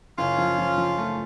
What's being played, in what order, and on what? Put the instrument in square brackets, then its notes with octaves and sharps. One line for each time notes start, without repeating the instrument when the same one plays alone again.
[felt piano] F#1 [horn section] C#4 F4
[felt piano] F3
F3
F3
A3